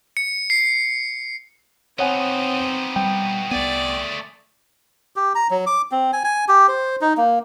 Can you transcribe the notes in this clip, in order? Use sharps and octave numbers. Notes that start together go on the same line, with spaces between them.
C#7
C7
B3 C4 D#4 C#5 F#5 G#5
G3 G5
C2 A3 B3 G#4 D5
G4
A#5
F#3
D6
C4
G#5
G#5
G4
C5
D#4
A#3